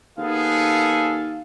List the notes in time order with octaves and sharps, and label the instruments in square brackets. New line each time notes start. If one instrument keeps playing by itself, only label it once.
[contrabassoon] D#2 [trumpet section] B3 G#4 A4 [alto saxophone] F5